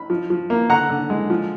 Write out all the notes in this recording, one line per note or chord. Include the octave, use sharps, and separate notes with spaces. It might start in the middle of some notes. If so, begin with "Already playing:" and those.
Already playing: B5
F3
F3
A#3
D3 F#5 A#5
D3
G#3
F3